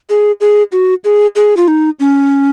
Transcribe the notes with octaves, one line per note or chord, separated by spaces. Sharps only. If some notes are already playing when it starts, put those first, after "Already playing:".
G#4
G#4
F#4
G#4
G#4
F4
D#4
C#4